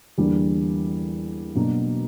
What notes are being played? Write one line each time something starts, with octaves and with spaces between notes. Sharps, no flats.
E2 D3 G3 A#3 D4
B2 F#3 A#3 D4 A#4